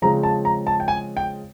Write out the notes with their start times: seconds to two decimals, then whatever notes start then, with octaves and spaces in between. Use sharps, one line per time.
0.02 C#3 F3 G#3 C4 A#5
0.23 A5
0.45 A#5
0.67 A5
0.80 G5
0.88 G#5
1.17 G5